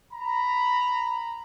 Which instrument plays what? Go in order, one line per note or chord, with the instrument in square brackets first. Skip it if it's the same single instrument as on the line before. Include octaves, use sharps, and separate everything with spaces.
[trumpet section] A#5 B5